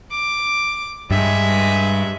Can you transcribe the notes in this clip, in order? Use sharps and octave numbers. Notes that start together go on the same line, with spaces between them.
D6
G2 G3 G#3 E5